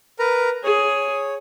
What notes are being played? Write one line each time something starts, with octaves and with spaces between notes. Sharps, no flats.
A#4 B4 A#5
G#4 C#5